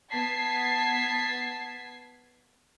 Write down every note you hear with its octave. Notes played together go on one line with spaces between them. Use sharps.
B3 A5 G#6 B6 C7